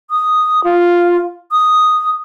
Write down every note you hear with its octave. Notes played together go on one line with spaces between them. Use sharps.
D#6
F4
D#6